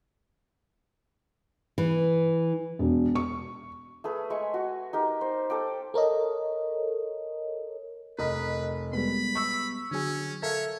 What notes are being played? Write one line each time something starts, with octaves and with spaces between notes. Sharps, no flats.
E3
E1
C#6
A3 G#4 B4
G#3 E5 G#5 C#6
F#4
D#4 G4 A#4
C5
A4 G5 D6
A4 A#4 C#5 D#5
F1 A#4 B4 D#5 B5
G3 G#3 B3 B5
C#6 E6
D3 F#3 C#4 G#4
A4 A#4 C#5 E5 F5